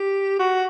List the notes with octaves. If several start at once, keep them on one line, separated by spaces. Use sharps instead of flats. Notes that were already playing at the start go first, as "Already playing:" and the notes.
Already playing: G4
F#4